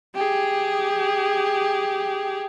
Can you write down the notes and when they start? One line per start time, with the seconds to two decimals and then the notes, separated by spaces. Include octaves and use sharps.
0.15 G4 G#4